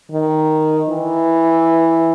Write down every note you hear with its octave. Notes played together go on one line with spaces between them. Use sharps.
D#3
E3